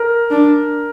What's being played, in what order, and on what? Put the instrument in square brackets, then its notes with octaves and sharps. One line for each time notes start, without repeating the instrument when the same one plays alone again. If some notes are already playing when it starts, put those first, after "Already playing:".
Already playing: [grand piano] A#4
[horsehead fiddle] D4